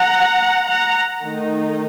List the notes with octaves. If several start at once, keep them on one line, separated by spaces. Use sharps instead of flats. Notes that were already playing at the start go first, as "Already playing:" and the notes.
Already playing: F#5 A#5
F#5 A#5
D#3 A3 D#4